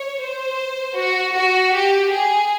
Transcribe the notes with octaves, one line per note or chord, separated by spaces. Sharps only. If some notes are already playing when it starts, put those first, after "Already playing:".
Already playing: C#5
C5
F#4
F#4
G4
G#4